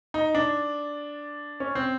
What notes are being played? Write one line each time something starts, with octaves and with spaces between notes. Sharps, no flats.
D#4
D4
C#4
C4